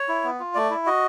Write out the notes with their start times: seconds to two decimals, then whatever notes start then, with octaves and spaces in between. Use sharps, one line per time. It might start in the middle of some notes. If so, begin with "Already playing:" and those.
Already playing: C#5
0.08 E4
0.24 B3
0.40 F4
0.55 A3 D5
0.70 E4
0.86 F#4 D#5